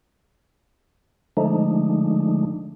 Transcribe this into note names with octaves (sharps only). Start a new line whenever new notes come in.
D3 F3 G#3 A3 D4 D#4